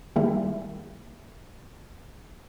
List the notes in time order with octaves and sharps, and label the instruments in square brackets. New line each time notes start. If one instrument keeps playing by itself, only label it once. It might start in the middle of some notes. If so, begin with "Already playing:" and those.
[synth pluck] D#3 G3 G#3 A#3 E4